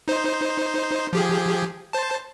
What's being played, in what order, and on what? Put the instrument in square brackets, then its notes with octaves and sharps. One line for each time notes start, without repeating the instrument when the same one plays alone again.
[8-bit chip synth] D#4 C5
F3 G4 G#4
C5 A5